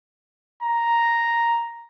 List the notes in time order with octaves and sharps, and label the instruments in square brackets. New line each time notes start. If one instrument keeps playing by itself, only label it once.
[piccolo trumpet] A#5